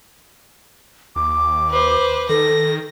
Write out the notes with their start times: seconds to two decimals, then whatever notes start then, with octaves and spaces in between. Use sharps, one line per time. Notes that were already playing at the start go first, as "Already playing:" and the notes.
1.16 D#2 D6
1.70 B4 C5
2.29 D#3 A4 A#6